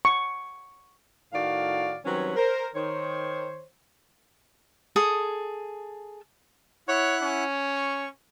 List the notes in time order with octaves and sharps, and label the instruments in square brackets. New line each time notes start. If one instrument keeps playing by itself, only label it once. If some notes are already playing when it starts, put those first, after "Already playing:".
[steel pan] C#6
[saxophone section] A2 D#3 F#4 D5 F5
D#3 F#3 G3 C4 C#4 B4
A#4 C5
D#3 C5 C#5
[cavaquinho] G#4 A4 D#6
[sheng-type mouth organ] E4 F#5 F#6 [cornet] C#5
[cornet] C#4
[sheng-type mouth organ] C#6